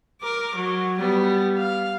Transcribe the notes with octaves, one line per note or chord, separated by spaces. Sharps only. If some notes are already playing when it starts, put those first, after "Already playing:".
A#4 D6
F#3
G3 B3
F5